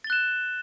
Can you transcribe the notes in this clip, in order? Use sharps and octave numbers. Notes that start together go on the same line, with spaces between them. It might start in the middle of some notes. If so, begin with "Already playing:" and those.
F#6 A6 E7 G7